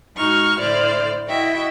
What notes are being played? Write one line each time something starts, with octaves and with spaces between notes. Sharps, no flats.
G#2 D#4 F#4 C#6 F6
A2 D3 E4 C5 D5 F6
E4 F#4 D#5 E5 G5